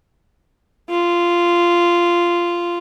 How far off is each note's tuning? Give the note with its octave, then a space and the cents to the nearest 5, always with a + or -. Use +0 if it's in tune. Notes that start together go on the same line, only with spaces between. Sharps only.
F4 -10